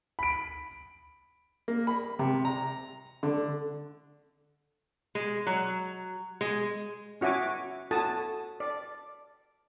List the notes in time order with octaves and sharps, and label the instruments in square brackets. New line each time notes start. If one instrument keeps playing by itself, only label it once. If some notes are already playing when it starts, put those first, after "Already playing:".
[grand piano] B5 D7
[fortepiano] A#3
B5
C3
A#5
D3
[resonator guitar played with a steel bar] G#3
F#3
G#3
[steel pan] C#4 F#4 E5 G#5 D6
F#4 A4 G#5 A5 D#6
D5